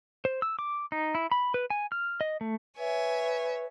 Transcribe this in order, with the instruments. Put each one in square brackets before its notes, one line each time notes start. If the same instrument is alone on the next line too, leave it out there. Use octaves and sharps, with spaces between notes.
[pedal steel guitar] C5
E6
D6
D#4
E4
B5
B4
G#5
F6
D#5
A3
[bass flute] B4 [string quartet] C#5 E5 G#5